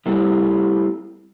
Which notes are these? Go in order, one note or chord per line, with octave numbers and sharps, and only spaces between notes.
G3 A3 C4 E4 G4